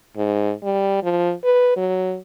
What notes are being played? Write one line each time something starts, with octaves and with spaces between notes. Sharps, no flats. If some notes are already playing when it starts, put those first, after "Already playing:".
G#2
G3
F3
B4
F#3